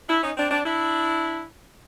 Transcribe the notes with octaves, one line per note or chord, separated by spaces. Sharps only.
D4 E4
C#4 D#4
C4 D4
C4 D4
D4 E4